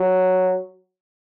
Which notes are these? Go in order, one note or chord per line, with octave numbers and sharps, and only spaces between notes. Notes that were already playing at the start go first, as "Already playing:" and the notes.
Already playing: F#3